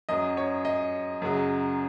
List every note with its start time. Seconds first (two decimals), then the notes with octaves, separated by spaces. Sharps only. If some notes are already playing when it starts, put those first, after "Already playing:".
0.09 F#2 F#3 D#5
0.37 C#5
0.65 D#5
1.22 F#2 C#3 F#3